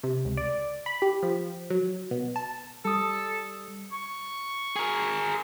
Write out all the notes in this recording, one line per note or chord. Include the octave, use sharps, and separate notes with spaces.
C3
C#2
D5
B5
G4
F3
F#3
B2
A5
G3 A4 D#6
C#6
G#4 A#4